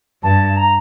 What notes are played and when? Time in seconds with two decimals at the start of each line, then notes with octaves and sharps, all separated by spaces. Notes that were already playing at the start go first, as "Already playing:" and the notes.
0.23 G2 A5
0.56 A#5